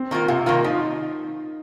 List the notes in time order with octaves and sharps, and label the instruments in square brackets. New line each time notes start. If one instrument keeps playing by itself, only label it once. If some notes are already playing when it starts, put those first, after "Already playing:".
Already playing: [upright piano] C4
[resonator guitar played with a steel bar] D#3 A#3 F4
[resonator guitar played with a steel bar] C3 [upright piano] F4
[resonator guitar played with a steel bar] D#3 A#3 F4
[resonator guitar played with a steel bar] F3 [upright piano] D#4